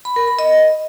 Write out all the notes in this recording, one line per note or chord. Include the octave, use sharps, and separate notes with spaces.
B5
A#4
B5
D#5